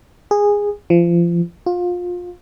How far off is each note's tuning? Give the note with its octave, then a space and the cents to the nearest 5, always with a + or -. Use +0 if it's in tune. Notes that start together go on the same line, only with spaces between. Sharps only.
G#4 -15
F3 -30
F4 +25